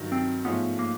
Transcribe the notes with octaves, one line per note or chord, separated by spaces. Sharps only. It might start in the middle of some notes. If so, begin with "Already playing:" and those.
Already playing: G2 D#3 F#3
C4
G#2 F3 A3 B3 C#4 F4
A#3